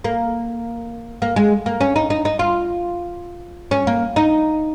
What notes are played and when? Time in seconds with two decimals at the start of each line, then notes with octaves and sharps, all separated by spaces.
0.04 A#3
1.22 A#3
1.36 G#3
1.66 A#3
1.81 C#4
1.96 D#4
2.10 D#4
2.25 D#4
2.39 F4
3.71 C#4
3.87 A#3
4.16 D#4